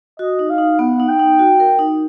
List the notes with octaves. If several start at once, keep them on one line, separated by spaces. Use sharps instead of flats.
F#4 D#5
D#4
F5
D#4
B3 F#5
D#4
G5
D#4
F#4
A#4
D#4